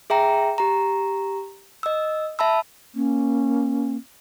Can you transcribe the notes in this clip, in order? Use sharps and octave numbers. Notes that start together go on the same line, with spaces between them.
G#4 E5 G5 A#5
G4 A#5
D#5 E6
E5 A5 B5 E6
A#3 C#4